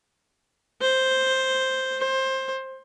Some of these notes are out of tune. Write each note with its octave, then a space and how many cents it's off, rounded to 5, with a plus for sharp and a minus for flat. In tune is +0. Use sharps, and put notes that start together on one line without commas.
C5 +5
C5 +20